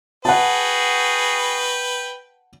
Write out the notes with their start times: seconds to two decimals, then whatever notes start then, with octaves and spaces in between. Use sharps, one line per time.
0.25 F#4 G#4 B4 F#5 G5 A5